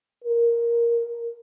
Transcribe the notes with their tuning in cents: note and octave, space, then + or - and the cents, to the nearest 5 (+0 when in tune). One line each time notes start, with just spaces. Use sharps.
A#4 +5